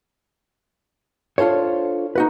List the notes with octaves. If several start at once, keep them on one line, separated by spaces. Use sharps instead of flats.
D4 F4 A4 C5 C#5
D#4 F#4 B4